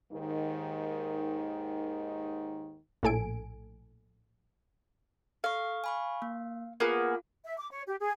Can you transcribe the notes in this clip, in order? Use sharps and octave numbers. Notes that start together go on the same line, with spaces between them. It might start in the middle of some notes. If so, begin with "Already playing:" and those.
D#2 G#2 D#3
A#1 A2 A4 G#5 D7
A4 F5 C#6
G#5 B5 C#6
A#3
A#3 B3 F4 G#4 F5
E5
D6
C#5
G4
G#4